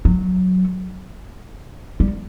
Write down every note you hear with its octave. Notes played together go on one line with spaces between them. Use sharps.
F#3
G3